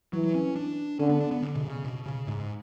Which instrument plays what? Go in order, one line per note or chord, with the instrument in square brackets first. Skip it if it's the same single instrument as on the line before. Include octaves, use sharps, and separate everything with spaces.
[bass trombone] E3 [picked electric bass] F#3
[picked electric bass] C#4
D4
[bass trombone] D3 [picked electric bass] C#4
[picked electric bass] B3
D4
B3
D3
B2
C#3
B2
C#3
G#2